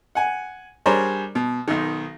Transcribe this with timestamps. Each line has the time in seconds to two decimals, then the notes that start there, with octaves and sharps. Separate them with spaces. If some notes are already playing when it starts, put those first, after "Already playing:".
0.15 F#5 G#5
0.86 G3 D4 G#4 A#4 C5 C#5
1.35 B2
1.68 B1 D#3